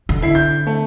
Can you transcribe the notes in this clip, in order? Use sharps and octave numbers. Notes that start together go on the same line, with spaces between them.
D3
E4 C7
G6
A3